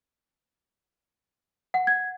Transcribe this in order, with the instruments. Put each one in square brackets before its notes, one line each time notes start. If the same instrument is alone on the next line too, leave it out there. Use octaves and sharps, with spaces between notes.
[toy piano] F#5
[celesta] G#6